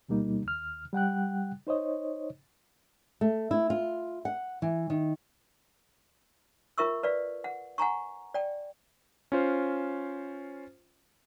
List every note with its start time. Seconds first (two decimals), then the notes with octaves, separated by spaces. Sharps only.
0.09 D2 B2 G3 A#3 D#4
0.45 D#2 F6
0.93 G3 F#5 G5 F#6
1.67 D#4 C5 C#5 D#5
3.21 A3
3.51 E4
3.70 F4
4.25 F#5
4.62 E3
4.90 D#3
6.78 F4 A#4 E5 C#6 E6
7.03 B4 D5 F5
7.44 F#5
7.78 F#5 G#5 A#5 C#6
8.34 D5 G5
9.32 C#4 F4 C5